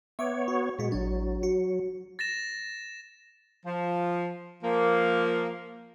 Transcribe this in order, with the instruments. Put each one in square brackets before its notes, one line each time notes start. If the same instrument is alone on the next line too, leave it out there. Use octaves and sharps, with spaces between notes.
[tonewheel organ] B3 C#5 [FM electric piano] E5 C#6 D6
[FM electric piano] F#4
[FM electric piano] A#2 F#4 [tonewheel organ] G#3
[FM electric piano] A1 D4 [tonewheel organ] F#3
[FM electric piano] F#4
[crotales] A6 A#6 E7
[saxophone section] F3
F3 A#3